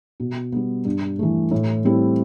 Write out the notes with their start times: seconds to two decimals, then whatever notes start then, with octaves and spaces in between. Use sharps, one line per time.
0.20 B2
0.52 G3 B3
0.85 G2
1.19 E3 A3
1.51 A2
1.85 G3 C4 E4